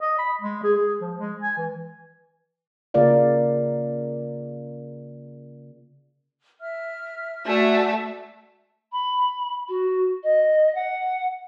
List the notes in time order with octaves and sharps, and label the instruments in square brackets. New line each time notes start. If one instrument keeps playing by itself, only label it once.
[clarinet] D#5
B5
G#3
G#4
G#4
F3
G#3
G#5
E3
[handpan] C#3 A#3 F4 A#4 D5 F5
[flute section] E5 F6
[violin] A3 E5 [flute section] F#4 D5 G#5
[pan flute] B5
F#4
D#5
F#5